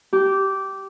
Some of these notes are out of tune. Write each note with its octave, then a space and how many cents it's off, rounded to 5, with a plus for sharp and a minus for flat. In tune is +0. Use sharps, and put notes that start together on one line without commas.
G4 -15